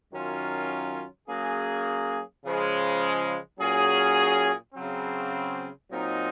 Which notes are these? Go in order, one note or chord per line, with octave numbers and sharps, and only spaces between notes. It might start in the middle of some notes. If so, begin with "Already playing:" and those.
F#2 D#3 F#3 C#4 F4
F#3 A#3 C#4 G#4
C#3 F3 G#3
A#2 F#3 C#4 G#4
C#3 F#3 C4
A#2 F#3 C4 D#4